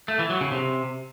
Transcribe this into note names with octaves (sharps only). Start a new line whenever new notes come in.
A3
E3
F#3
C#3
C3